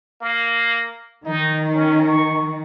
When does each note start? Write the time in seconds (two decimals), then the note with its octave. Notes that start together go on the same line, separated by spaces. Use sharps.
0.21 A#3
1.26 D#3 D#4
1.74 C#4
2.07 C#6